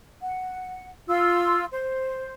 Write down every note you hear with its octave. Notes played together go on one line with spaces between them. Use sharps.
F#5
F4 C6 E6
C5